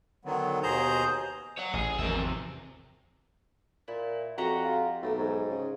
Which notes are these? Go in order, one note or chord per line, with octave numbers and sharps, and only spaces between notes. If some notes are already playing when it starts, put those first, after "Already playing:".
D3 D#3 F#3 B3
D#2 B2 G#4 C5 A#5 G6
C#5 F#5
A1 G#4
G#1 E2 F3 A#4 E5
C3
A#2 E4
F2 F#4 G4 F#5 A#5
F4
B1 A3
G#2
C#3